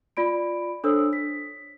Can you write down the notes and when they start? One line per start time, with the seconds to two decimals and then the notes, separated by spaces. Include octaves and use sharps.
0.17 F4 D5 B5 D7
0.84 D4 A4 C5 C#5 D#6 E6
1.13 B6